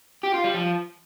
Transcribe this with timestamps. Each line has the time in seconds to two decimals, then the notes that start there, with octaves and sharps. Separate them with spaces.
0.24 G4
0.34 F4
0.44 G3
0.54 F3